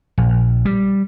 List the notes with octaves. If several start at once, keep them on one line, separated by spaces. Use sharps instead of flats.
A#1
G3